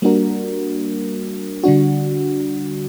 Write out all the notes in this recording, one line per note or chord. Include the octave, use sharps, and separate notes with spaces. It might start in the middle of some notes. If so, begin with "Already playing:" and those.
G3 A#3 D4 F#4 A#4
D3 G3 D4 F#4